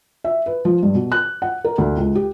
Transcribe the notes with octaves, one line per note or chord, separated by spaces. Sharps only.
E5
B4
F3
G2
B2
F#6
F#5
A#4
D2
C#2
G4